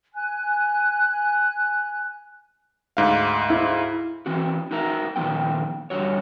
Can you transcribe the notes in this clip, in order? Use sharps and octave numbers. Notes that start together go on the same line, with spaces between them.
G#5 F#6
D2 G#2 F5
E4
E3 C4 F#4
D#4 F#4 A#4 E5 A#5
A#2 D#3 F3 B3 G5
G2 D3 G3 F#4 C#5